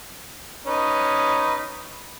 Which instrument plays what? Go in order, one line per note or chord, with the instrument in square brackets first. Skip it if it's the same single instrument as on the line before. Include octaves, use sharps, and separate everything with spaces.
[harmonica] C#4 D#4 B4